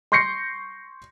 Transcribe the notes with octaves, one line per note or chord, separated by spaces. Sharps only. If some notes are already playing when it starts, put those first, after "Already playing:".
C6 C#6 G6 A#6 C7 C#7